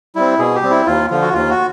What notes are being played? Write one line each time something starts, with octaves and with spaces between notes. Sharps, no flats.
G3 C4 E4
B2 G#4
G4
G3 C4
E4
D#2 F4
D3 F3 F4
F#4
D#2 F4
F#4